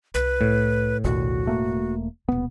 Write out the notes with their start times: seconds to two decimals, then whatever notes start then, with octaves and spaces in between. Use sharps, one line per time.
0.14 C2 B4
0.41 A2
1.04 A#1 D#2 B2 F#4
1.46 E1 A3 A#3
2.29 D#1 B2 B3